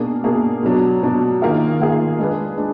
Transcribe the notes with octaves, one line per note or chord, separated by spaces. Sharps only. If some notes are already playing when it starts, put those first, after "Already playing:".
Already playing: B2 A#3 D4 G#4
B2 A#3 D4 G#4
B2 F#3 D4
B2 F#3 D4
D#3 A#3 F4 G#4
D#3 A#3 F4 G#4
G#3 D4 G#4 B4
G#3 D4